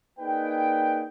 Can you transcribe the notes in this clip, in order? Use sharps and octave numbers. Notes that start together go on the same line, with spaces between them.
A#3 D#4 G#4 B4 D5 G5